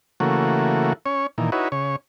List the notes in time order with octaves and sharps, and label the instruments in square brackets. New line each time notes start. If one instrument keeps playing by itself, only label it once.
[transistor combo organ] C#3 E3 A3 A#3 F#4
C#4 C#5
A#2 D#3 E3
D#4 E4 F#4 B4 C#5
C#3 C#5